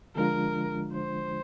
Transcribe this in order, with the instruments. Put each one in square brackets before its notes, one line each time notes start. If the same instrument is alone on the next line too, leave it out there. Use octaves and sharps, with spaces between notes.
[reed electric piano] D3 F3 G#3 D4 F4 [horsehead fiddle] A#4
[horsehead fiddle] C5